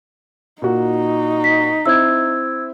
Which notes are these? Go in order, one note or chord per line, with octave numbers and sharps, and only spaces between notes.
A#2 D#4 F#4
B6
C4 E4 E6 G#6